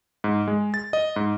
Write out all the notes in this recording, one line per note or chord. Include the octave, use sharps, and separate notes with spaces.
G#2
G#3
A6
D#5
G#2